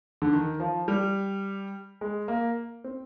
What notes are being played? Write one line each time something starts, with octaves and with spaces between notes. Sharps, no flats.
D3
D#3
F3
G3
G#3
A#3
C4